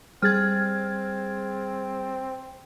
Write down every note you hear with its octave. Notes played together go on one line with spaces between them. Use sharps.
G3 C4 G#4 F6 G#6 A6